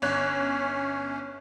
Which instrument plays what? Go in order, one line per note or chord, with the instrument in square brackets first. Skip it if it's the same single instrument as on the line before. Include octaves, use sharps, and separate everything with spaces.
[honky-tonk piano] G1 C#5 F#6 [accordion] C#4